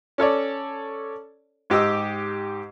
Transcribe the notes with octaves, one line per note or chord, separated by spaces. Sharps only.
C#4 A4 C#5 D5
G#2 G4 D#5 E6